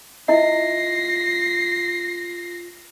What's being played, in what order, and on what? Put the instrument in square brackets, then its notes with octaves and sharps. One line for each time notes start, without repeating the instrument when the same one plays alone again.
[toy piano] E4 D#5 E5 [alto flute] F4 [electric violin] A#6 C7